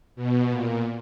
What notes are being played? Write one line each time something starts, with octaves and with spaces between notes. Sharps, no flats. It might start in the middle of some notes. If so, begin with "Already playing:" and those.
B2
A#2